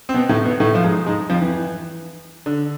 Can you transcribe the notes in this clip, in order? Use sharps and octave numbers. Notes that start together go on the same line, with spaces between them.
C4
B2 B3
A2 A3
B2 B3
A2 A3
F3
G#2 G#3
G#2 G#3
F2 F3
E3
D3